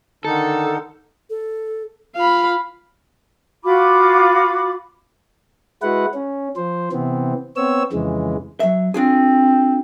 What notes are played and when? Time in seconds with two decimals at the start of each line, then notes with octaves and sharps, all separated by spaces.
0.25 D3 D#3 D#4 A4
1.30 A4
2.16 F4 F5 B5
3.63 F4 F#4 B5 D6
5.82 G#3 E4 F#4 B4 F#5
6.14 C#4
6.56 F3 C5
6.92 C3 E3 B3 C4
7.56 B3 C4 C#5 E6
7.93 F2 C#3 E3 G#3
8.60 F#3 E5
8.94 C4 D4 F4 G#4